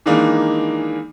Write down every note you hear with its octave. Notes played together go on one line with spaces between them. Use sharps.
D#3 E3 G#3 A#3 D4 D#4